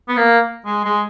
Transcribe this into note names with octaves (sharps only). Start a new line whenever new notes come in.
B3
A#3
G#3
G#3